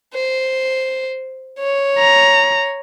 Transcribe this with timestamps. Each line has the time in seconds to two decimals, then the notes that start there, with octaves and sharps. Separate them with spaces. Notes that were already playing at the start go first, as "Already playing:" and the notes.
0.14 C5
1.59 C#5
1.99 A#5